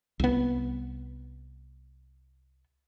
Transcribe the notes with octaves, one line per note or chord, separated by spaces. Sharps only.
C2 B3